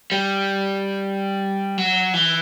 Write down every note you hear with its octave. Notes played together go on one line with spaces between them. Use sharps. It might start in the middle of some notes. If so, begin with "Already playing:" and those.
G3
F#3
E3